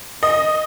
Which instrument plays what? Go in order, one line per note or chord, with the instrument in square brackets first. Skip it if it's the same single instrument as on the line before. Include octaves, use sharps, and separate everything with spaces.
[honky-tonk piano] D#5